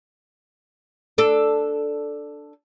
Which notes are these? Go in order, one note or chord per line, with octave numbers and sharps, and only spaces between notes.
D4 A4